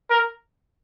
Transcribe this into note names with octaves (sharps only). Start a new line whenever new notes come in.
A#4